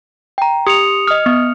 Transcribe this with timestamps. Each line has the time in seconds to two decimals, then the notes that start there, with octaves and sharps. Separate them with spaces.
0.38 G5 A#5
0.67 G4 D#6 C#7 F7
1.08 D#5 D#6 F6
1.26 B3